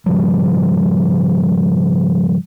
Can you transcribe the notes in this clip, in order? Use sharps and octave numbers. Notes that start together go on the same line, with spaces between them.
G#2 C#3 F3 G3